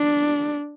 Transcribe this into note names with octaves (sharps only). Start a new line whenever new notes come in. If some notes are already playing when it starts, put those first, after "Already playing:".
Already playing: D4